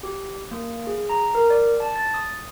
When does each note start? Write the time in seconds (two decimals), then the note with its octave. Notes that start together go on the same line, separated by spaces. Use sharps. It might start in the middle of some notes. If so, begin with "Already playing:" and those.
0.03 G4
0.51 A#3
0.87 G#4
1.09 A#5
1.35 A#4
1.50 D5
1.80 A5
1.96 A6
2.14 D#6